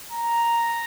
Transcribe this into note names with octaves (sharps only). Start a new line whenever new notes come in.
A#5